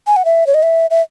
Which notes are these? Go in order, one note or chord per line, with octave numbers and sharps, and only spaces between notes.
G#5
F#5
E5
C#5
D#5
E5
E5